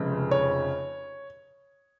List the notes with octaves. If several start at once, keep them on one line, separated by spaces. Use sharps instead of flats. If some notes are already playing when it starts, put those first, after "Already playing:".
Already playing: F1 F2 C#3 G#3
C#5